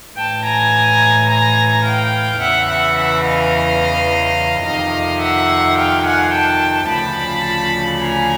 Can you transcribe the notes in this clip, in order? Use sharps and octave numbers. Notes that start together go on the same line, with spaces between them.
A2 E3 G5 A5
G#5 A#5
G#5 A#5
F5 G5
E2 C#3 E3 E5 F#5
E5 F#5
E5 F#5
D#5 F5
F2 C3 D#3 D#5 F5
E5 F#5
F5 G5
F#5 G#5
G5 A5
D2 C#3 F3 A5 B5
G#5 A#5